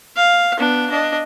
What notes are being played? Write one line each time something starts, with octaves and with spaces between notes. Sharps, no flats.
F5
B3 D4
D4 D#5